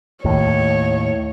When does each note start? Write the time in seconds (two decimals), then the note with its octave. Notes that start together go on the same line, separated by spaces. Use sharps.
0.25 D#2 A2 C#5